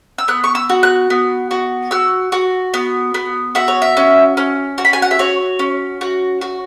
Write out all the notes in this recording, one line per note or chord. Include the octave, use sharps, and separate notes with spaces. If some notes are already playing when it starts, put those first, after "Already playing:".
E6
B3 F#6
C#6
E6
F#4
F#6
B3
F#4
F#4 E6
F#4
B3
B3
F#4 E5
C#5
E5
C#4
C#4
F#4
B5
G#5
F#5
E5
F#4 C#5
C#4
F#4
F#4